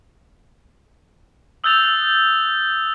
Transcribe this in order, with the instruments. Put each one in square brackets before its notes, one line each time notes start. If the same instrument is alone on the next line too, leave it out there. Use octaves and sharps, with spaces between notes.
[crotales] D#6 E6 F#6 G6 A6 F7